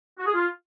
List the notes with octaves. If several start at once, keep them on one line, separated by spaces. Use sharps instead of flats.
F#4
G#4
F4